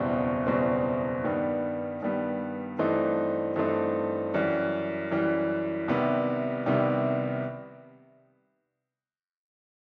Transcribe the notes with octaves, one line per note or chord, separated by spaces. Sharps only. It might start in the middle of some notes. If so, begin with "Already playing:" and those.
Already playing: F#1 E2 B2 G3 C4
F#1 E2 B2 G3 C4
G2 D#3 G3 B3
G2 D#3 G3 B3
G2 E3 A3 C4 D#4
G2 E3 A3 C4 D#4
F#2 E3 G3
F#2 E3 G3
C2 C3 D#3 G3 B3
C2 C3 D#3 G3 B3